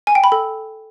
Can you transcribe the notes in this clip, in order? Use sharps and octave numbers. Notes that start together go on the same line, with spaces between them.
G#5
G5
B5
A4